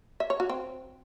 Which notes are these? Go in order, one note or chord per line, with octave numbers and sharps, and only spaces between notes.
E5
C#5
F#4
C4